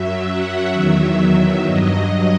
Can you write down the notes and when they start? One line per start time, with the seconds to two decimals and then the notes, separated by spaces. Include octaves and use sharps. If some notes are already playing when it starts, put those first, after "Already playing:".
Already playing: F#2 F#3 E5
0.27 F#5
0.73 E2 D#3 F#3 E5
1.63 G2 F#3 D#5